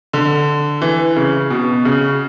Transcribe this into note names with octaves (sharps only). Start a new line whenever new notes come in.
D3
E3
C#3
B2
C#3